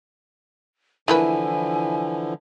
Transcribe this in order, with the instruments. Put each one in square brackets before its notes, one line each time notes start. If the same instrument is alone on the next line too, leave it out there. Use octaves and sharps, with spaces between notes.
[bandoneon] D3 E3 F3 [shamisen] A3 A#3 B4 [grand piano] E4 [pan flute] G#5